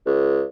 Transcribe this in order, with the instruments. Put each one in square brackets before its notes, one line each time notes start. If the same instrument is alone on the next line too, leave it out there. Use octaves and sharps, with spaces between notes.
[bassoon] C#2